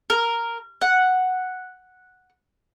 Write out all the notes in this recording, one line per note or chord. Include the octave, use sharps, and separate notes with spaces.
A#4
F#5